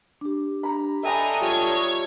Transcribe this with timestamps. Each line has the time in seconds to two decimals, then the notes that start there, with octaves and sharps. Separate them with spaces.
0.21 D4 G4
0.63 A#5 B5
1.03 D4 A4 D#5 E5 G5 G#5 A#5 B5
1.41 G3 F4 C#5 G#6